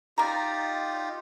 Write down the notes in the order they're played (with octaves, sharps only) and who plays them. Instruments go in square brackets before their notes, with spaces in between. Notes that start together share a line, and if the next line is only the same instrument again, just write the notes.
[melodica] D#4 F4 G4 [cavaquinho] D5 A#5